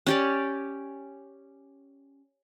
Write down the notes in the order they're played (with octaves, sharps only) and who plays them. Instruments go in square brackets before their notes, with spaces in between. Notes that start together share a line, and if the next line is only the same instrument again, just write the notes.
[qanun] C#4 G4 D5